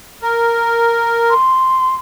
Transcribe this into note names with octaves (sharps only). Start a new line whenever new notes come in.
A#4
C6